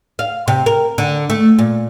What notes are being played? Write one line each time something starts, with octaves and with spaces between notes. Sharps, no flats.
F5
C3
A#4
D3
A3
A#2